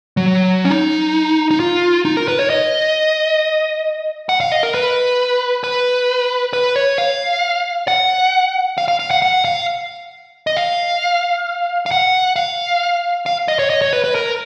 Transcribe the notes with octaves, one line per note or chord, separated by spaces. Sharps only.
F#3
C#4
D#4
D#4
F4
D#4
A#4
B4
C#5
D#5
F#5
F5
D#5
A#4
B4
B4
B4
C#5
F5
F#5
F5
F5
F5
F#5
F#5
F5
D#5
F5
F5
F#5
F5
F5
D#5
C#5
D#5
C#5
B4
B4
A#4